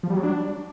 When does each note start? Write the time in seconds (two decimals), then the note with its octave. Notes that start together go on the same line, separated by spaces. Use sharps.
0.03 F3
0.10 G3
0.17 F#3
0.23 D4